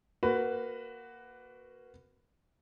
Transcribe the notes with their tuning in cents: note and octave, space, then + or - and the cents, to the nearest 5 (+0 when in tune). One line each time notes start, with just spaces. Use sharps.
A#3 +0 F#4 +0 B4 +15